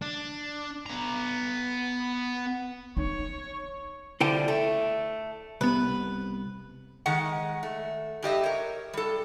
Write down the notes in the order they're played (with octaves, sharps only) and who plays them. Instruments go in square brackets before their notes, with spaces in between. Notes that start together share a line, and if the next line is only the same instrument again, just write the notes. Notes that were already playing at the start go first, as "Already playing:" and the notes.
[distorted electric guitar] D4
B3 A#5
[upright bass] D#4 [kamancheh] C#5
[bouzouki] D3 F3 G3 [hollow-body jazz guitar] E4 A4 G5
[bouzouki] A3
[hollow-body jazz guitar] C2 B3 [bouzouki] B4
[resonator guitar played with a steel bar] D#3 G#3 F#5
A3
G2 G4 D#5 E5
A#4 C#5
G3 A4